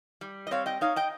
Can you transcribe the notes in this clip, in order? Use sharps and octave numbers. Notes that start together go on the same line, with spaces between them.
G3
D#5
C4 C#5 F5
D#5 G5
D#4 C#5 F5
D#5 G5